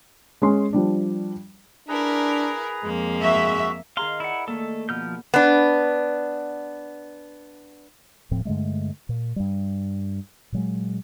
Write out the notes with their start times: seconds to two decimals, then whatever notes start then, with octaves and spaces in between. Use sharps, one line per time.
0.42 G#3 C#4 C6
0.73 F3 G3 D4
1.88 D4 E4 G#4 A#4 B4 A#5
2.84 F2 G#3 A#3
3.23 F#4 E5
3.97 D#3 G#4 F5 A#5 C6
4.20 E4 D5 F#5
4.48 D#3 A3 A#3 A4
4.89 B2 F3 F6 G6
5.34 B3 D4
8.31 D#1 A2 F3 C4
8.45 G2 D3 G#3 A3
9.09 A#2
9.36 G2 G3
10.52 A#2 F#3 G#3